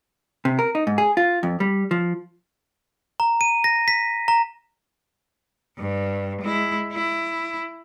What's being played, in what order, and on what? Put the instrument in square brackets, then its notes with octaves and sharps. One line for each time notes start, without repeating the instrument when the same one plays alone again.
[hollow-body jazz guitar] C3
A#4
D#4
G#2
G#4
F4
F2
G3
F3
[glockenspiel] A#5
D#7
A#6
B6
A#5
[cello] G2
G#3 E4
E4